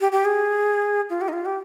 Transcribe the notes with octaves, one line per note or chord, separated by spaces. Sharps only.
G4
G4
G#4
F4
G4
D#4
F4
G4